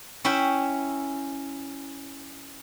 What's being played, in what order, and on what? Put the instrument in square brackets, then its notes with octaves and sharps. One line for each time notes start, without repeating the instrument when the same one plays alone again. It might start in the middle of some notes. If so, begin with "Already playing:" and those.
[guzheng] C#4 E4 E5 G5